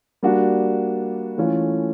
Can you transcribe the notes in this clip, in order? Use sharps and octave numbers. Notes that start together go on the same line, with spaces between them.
G3 A#3 D4 F#4
E3 A3 C#4 F4 A4